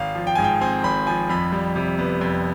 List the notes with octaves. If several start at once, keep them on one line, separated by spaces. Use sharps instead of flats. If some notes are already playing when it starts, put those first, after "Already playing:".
Already playing: G#1 F5
F3
G5
G#2 G#5
G5
C4 G#5
G#1 B5
F3 G#5
F2 B5
G3
C3
B3
F2